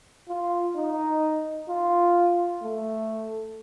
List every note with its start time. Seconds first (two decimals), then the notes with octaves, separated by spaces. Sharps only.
0.28 F4
0.75 D#4
1.69 F4
2.62 A3